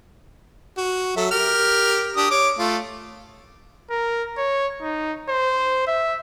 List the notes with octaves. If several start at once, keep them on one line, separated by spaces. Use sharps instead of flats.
F#4
F#3 A4 E5
G4 A#4 F6
D4 G4 D#6
C#5 D6
A3 F4
A#4
C#5
D#4
C5
E5